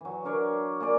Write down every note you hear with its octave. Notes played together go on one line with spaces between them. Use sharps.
E3 F#3
D4 A#4 C#5 D5
A#3 G#4 C5 D5